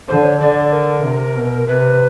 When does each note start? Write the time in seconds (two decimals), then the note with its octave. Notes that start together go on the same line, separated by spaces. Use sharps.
0.08 D3 C5
0.25 C#5
0.41 D3 D5
0.73 A#4
1.04 C3
1.36 B2
1.68 C3 B4